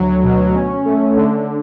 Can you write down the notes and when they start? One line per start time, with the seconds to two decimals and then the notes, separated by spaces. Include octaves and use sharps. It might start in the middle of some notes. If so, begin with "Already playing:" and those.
Already playing: D2 F#3
0.23 B2
0.54 C#4
0.85 A3
1.16 D3